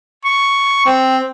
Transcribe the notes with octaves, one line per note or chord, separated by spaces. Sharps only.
C#6
C4